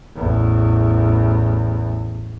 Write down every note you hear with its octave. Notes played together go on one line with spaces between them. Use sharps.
A1 E2